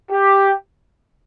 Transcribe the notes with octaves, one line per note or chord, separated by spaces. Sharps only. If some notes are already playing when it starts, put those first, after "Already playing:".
G4